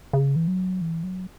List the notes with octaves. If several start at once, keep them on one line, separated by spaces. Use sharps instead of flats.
C#3
E3
F#3
E3
F#3